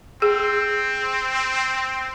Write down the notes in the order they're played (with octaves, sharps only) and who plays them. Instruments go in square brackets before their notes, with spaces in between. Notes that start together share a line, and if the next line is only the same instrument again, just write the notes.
[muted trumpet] C4 [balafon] G#4